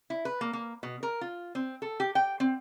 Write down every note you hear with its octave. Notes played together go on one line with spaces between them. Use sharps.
E4
B4
A#3
A#3
B2
A#4
F4
C4
A4
G4
G5
C4